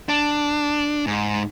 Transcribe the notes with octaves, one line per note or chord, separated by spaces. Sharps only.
D4
G#2